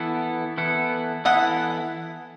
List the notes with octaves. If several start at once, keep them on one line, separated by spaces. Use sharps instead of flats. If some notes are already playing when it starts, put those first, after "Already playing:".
Already playing: E3 B3 E4 A4
E3 B3 E4 A4
E3 B3 E4 A4 D#5 F#5